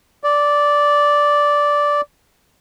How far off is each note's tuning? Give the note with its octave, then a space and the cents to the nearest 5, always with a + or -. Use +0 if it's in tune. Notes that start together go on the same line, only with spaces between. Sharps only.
D5 -10